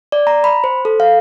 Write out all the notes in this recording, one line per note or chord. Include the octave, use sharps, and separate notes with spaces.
D5
A#5
B5
C5
A4
F5